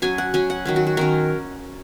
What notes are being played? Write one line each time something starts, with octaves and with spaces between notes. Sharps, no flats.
F#3 C#4 G#5
F#5
F#3 C#4 G#5
F#5
D#3 F#3 C#4
F#4
F#4
D#3 F#3 C#4 A#4